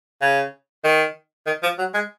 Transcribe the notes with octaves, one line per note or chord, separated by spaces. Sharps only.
C#3
D#3
D#3
F3
F#3
G#3